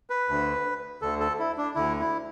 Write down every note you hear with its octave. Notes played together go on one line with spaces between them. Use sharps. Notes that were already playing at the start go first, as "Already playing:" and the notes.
B4
D2 D3
D2 D3 A4
A4
E4
D4
D2 D3 E4
E4